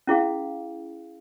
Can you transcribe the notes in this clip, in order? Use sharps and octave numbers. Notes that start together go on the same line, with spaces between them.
C#4 E4 G#4 F5